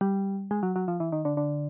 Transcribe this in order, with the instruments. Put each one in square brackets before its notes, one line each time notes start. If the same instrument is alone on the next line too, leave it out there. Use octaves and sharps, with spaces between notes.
[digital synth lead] G3
G#3
F#3
F#3
F3
E3
D#3
D3
D3